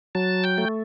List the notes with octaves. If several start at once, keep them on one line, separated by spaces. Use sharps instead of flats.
F#3 A5
G5
A3